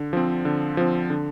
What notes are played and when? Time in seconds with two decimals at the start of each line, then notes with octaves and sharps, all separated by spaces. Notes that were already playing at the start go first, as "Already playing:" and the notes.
Already playing: D3
0.13 F3 C4
0.45 D3
0.77 F3 C4
1.10 D3